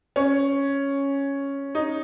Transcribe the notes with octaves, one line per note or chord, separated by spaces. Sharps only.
C#4
D#4